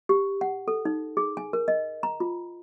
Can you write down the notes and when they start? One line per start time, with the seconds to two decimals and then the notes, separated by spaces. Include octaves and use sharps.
0.09 G4
0.41 F#5
0.68 A4
0.85 D#4
1.17 G#4
1.37 G#5
1.53 A#4
1.68 D#5
2.03 A#5
2.20 F4